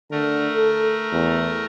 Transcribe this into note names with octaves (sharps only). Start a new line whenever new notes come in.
D3 A3 A#4
A4
E2